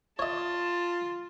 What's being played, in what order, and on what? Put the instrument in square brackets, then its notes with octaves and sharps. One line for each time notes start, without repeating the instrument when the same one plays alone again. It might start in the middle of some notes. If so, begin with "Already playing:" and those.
[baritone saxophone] F4 [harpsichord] C#5 D#5 [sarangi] A5